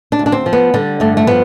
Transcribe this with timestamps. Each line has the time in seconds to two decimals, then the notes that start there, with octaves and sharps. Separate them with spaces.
0.12 D4
0.19 D2
0.26 D4
0.32 C4
0.46 F3
0.53 B3
0.74 D3 G3
1.00 G2 A3
1.17 A3
1.27 F3 B3